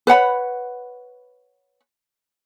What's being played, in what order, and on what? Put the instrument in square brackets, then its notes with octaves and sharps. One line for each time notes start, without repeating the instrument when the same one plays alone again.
[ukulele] B4 C#5 F#5 B5